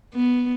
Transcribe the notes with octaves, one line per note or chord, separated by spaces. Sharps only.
B3